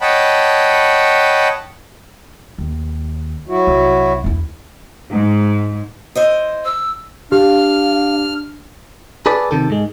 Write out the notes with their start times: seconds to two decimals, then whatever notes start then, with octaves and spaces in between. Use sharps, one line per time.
0.01 C#5 D#5 F#5 G5 A5 B5
2.58 D#2
3.48 F#3 E4 F#4
3.67 C2
4.24 E2 E4
5.09 G#2
6.15 E4 C5 D#5
6.65 E6
7.32 D4 G4 F5 F6
9.26 G#4 A4 B4 D5
9.51 C3 D#3 A4
9.70 G#2 G#3